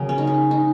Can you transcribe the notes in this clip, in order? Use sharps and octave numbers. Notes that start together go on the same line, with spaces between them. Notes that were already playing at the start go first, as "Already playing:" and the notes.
Already playing: C#3 F#3 A#3
C#4
D#4
C#4
D#4